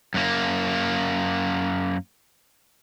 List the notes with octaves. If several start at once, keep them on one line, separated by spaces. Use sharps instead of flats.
F#2 A#3